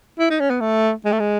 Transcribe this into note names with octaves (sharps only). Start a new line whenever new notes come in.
E4
D#4
C#4
B3
A3
G#3
A3
G#3